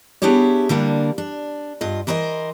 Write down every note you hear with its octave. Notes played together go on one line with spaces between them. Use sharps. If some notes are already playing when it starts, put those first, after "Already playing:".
B3 D4 E4 G4 G#4 C#5
D3 G3 A#3 D4
D4
G2 F4 D#5
E3 A#4 C5 C#5 D#5